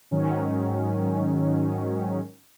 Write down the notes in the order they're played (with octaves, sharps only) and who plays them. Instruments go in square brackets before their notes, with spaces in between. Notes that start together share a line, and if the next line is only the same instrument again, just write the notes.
[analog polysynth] G#2 D#3 F#3 C#4